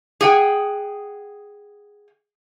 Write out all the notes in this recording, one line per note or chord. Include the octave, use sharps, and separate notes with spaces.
G#4 F#5 G5